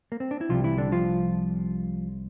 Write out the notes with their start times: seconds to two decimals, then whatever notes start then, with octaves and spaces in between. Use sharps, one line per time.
0.12 A#3
0.20 C4
0.31 D4
0.41 E4
0.49 C2 C3 F3 G3 F4
0.64 E3 E4
0.78 D3 D4
0.92 F3 F4